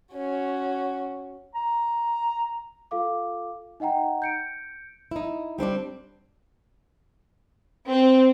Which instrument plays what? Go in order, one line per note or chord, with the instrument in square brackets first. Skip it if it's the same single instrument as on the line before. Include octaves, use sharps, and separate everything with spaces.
[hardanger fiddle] C#4 F#4
[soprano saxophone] A#5
[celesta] F4 A4 F5 D6
D#4 D#5 F#5 G5 A#5
G6 C#7 D7
[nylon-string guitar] D#4 E4
G3 C4 D4 D5
[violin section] C4